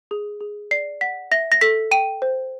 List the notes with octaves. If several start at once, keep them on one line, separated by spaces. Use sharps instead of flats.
G#4
G#4
D5 C7
F#5 B6
E5 A#6
A#6
A4 B6
G5 D#7
C5